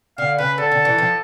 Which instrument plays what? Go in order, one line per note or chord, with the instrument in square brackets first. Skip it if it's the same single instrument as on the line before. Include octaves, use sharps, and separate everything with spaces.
[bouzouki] D3 [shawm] F5
[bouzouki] C#3 [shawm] B4
[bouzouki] D3 [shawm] A4
[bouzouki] D3
E3
F3